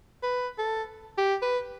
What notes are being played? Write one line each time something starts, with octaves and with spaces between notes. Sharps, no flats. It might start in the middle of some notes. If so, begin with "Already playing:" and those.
B4
A4
G4
B4